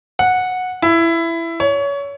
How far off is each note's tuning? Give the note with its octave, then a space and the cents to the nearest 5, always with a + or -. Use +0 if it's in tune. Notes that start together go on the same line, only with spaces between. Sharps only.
F#5 -10
E4 +15
C#5 +25